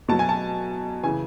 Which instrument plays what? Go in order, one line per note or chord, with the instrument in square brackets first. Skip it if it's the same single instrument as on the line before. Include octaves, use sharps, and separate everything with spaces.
[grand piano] B2 F#3 A5
G#5
A5
C#3 E3 G#5